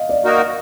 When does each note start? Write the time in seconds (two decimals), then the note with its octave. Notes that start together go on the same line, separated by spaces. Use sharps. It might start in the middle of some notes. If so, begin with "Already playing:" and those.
Already playing: D#5 F5
0.09 D5
0.25 A#3 D#4 F#4 A#4